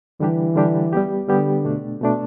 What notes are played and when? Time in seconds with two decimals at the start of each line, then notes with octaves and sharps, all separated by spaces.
0.20 D3 E3 G3 D4 G4
0.56 D3 G3 D4 G4
0.93 G3 B3 G4
1.29 D3 G3 B3 G4
1.65 B2 A3 D4
2.01 B2 A3 D4